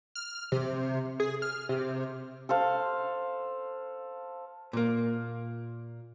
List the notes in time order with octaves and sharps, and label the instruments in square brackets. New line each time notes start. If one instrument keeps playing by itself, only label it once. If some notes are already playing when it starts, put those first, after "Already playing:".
[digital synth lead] F6
C3
G#4
F6
C3
[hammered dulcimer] A4 C5 F5
[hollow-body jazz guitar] A#2 A#3